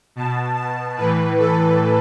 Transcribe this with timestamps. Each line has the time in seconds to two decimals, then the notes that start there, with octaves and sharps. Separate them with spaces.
0.16 B2 A5
0.56 A5
0.97 A2 E3 B4
1.38 A4